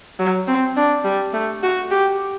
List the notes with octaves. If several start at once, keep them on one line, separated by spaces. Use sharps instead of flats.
F#3
C4
D4
G3
A3
F#4
G4